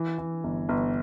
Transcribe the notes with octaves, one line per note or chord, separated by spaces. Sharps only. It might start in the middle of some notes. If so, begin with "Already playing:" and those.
Already playing: E3
E3
G1
G1